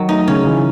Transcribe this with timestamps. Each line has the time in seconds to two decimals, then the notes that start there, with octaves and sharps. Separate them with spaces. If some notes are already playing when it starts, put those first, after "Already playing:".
Already playing: D#3 F#3
0.09 A3 D#4
0.28 C#3 C#4
0.46 E3